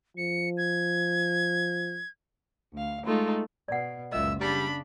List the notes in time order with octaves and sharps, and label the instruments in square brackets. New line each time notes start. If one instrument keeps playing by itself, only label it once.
[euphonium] F3 [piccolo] C#7
[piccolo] G#6
[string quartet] D2 F5
G#3 A3 D#4 F4
[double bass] B2 [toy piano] D5 F#5
[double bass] F#1 C#2 [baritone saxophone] A#2 [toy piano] D#5 [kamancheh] E5 E6
[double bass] C#3 [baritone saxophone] G3 [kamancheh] D4 B5